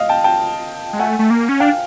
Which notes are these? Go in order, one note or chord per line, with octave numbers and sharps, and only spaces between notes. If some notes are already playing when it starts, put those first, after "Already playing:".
Already playing: D#5 F5
G5 A5
G5 A5
G#3
A3 F#5 G#5
A3
A#3
C#4
D4 F5 G5